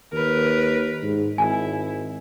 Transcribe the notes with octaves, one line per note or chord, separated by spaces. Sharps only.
D#2 A#4 B4
G#2
G#1 E4 G#5